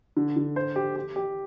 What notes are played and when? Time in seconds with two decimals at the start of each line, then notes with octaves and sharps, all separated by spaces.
0.17 D3
0.36 D3
0.56 C5
0.76 G4
0.96 G4
1.16 G4